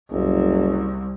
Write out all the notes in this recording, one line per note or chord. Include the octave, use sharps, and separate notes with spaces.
F#1 C2